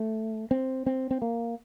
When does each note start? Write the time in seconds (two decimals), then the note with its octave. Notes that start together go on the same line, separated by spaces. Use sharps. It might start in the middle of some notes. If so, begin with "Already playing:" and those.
Already playing: A3
0.51 C4
0.86 C4
1.11 C4
1.22 A#3